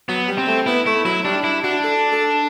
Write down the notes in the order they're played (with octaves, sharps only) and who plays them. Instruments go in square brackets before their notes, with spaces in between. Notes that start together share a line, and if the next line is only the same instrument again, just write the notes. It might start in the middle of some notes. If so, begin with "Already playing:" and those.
[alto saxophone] F#3 [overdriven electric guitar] B3
[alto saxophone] G3
[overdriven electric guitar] C4
[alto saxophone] A3
[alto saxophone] B3 [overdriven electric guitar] E4
[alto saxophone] A3 [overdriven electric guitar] E4
[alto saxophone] F#3 [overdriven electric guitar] E4
[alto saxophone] G3 [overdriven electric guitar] D4
[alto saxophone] D4 [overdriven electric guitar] E4
[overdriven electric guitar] D4 [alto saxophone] F#4
[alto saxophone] A4
A4